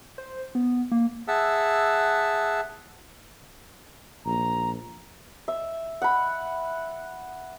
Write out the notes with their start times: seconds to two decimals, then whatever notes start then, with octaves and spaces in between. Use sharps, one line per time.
0.18 C5
0.55 B3
0.91 A#3
1.28 G#4 E5 F#5 A5 E6
4.25 A#1 A#5
5.48 E5
6.02 F#5 B5